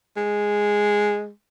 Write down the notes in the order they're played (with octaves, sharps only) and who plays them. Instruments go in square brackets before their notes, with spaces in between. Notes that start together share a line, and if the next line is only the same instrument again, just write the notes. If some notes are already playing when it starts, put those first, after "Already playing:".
[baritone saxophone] G#3